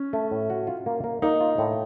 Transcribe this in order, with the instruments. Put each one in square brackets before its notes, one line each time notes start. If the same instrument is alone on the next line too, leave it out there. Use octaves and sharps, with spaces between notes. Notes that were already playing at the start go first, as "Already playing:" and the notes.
Already playing: [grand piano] C#4
[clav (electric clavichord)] A3
A2
F#4
F4
A#3
A#3
[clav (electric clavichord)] A#3 [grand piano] D#4
[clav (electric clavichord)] F4
A2